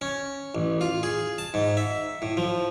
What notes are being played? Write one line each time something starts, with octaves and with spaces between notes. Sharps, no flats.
C#4
A1
F4
G#4
A5
G#2
E5
A2
F3